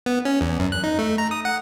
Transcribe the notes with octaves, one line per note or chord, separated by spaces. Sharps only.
B3
C#4
E2
F#2
F#6
D#4
A3
A#5
D#6
F#5